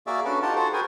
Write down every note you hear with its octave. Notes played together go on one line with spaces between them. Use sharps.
A#3 F#4 G#4 D5 E5
C#4 D4 F#4 A4 B4 D5
D#4 F4 G4 A4 F#5 A5
F#4 G#4 A4 C5
F#4 G#4 A#4 B4 G5 G#5